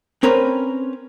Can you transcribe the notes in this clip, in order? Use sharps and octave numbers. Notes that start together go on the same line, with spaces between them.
C4 C#4 A#4 B4